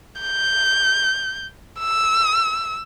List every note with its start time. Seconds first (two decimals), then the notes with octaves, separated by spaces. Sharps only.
0.21 G6
1.79 E6